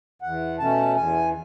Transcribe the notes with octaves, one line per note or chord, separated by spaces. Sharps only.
E2 F#5
B2 A3 C#4 A5
E2 G#5